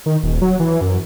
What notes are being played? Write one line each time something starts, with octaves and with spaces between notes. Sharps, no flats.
D#3
D#1
F#3
E3
F#2